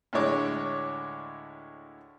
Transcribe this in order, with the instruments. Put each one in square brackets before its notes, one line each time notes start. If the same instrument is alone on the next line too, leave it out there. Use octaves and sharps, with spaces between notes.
[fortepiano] D2 A2 G#3 D4 C#5 D6